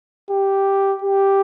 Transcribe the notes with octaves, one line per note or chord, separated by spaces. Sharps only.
G4
G4